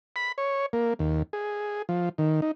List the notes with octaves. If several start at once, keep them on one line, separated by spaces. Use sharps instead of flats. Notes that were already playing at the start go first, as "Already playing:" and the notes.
B5
C#5
A#3
D#2
G#4
F3
D#3
D#4